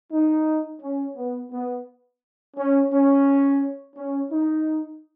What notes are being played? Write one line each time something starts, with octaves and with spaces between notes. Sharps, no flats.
D#4
C#4
B3
B3
C#4
C#4
C#4
D#4